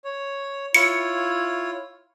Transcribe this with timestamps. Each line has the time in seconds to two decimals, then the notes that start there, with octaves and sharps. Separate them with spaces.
0.04 C#5
0.75 E4 F4 C#5 C#7